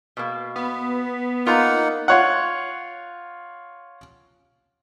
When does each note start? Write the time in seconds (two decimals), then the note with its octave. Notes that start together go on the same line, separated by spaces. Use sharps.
0.17 B2 A#3
0.56 B3
1.46 A#3 D#4 F4 F#5 A#5
2.08 F4 C#5 F#5